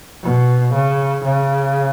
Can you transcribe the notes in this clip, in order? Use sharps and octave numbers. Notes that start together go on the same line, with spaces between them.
B2
C#3
C#3